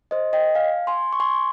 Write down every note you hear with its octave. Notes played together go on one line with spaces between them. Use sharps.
C5 D#5
D#5 G5
F5 G#5
G#5 C6
C#6
G#5 C6